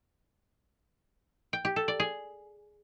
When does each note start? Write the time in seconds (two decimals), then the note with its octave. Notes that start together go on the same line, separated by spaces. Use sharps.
1.53 G5
1.65 G4
1.76 A4
1.88 D5
2.00 G#4